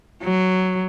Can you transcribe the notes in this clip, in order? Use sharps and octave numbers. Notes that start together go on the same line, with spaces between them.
F#3